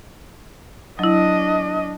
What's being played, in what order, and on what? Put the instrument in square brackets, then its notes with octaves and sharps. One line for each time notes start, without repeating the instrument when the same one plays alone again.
[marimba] F#3 E4 [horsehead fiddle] D4 D#5